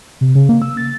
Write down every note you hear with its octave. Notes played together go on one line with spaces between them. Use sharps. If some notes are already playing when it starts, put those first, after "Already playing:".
C3
C#3
A#3
E6
A6